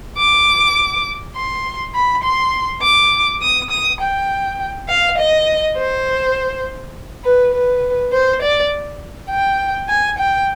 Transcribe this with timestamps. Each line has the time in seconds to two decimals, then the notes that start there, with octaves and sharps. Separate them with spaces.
0.18 D6
1.36 C6
1.95 B5
2.24 C6
2.82 D6
3.42 D#6
3.71 D#6
4.00 G5
4.88 F5
5.18 D#5
5.77 C5
7.24 B4
7.54 B4
8.13 C5
8.42 D5
9.30 G5
9.89 G#5
10.18 G5